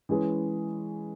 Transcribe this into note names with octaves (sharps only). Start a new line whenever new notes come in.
E3 G#3 C#4 G#4 B4